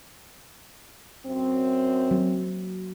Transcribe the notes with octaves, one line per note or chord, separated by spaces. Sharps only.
F#2 C4
F#3 A#3